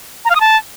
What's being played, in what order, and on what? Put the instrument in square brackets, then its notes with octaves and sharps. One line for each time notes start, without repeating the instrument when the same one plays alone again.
[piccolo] A#5
F5
D#6
A5